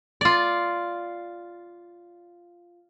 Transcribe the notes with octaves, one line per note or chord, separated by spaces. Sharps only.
F4 D5